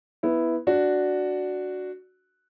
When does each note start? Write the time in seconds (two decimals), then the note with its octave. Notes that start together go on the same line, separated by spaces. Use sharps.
0.23 B3 E4
0.67 D4 F#4